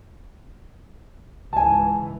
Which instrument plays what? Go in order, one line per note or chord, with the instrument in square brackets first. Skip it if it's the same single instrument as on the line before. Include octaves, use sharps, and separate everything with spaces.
[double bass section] C#2 G#2 E3 [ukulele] G#5 A5